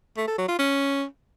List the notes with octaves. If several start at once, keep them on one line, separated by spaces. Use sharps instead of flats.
A3
A4
F#3
F4
C#4